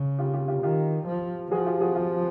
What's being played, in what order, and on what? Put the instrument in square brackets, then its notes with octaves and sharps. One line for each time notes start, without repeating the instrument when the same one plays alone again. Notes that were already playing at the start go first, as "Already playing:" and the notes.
Already playing: [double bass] C#3
[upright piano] F4 G4
F4 G4
F4 G4
[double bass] D#3 [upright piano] F4 G4
[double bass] F3
[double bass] F3 [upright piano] F#4 G#4
[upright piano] F4 G4
F#4 G#4
F4 G4